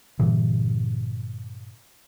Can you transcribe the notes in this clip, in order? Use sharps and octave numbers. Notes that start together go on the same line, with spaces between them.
G2 A#2 D3 E3